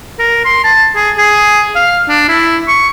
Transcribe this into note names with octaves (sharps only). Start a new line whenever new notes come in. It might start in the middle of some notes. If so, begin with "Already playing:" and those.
A#4
C6
A5
G#4
G#4
F5
D4
E4
C#6